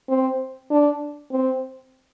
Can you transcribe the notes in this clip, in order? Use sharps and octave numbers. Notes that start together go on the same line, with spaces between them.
C4
D4
C4